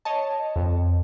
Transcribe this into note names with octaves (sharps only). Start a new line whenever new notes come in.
C#5 D#5 A5
F2